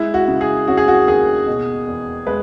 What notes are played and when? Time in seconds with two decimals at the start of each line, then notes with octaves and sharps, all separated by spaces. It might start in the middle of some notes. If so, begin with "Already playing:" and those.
Already playing: G#3 E4
0.14 F#4
0.28 C#3
0.41 G#4
0.68 C#4 F#4
0.77 G#4
0.88 F#4
1.07 D#2 G#4
1.47 B2
1.87 E2
2.27 G#3 B4